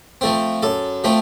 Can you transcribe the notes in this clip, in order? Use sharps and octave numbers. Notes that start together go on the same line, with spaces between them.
F3 A3 C4
F#2 A4
F3 A3 C4